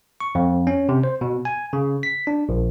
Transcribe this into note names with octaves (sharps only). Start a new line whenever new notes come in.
C#6
F2
C#4
C3
C5
B2
G#5
C#3
B6
D4
A#1